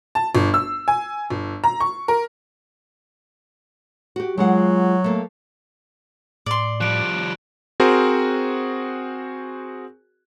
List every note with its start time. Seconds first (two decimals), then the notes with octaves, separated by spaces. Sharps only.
0.15 A5
0.35 G1
0.54 E6
0.88 G#5
1.30 G1
1.64 A#5
1.80 C#6
2.08 A#4
4.16 F#4 G4
4.38 F#3 G#3 F4 F#5
5.04 A3 A#3
6.46 A2 D5 C6
6.81 F3 G3 F#6 D7
7.80 C4 F#4 G#4 A#4 C5